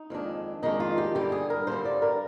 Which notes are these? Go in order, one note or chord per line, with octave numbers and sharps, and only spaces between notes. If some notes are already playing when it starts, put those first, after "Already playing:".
Already playing: D#4
F2 D#3 G#3 D4
F2 D#3 G#3 D4 D#4
F4
G4
G2 D3 G3 G4
G#4
A#4
G2 D3 G3 C5
D5
A#4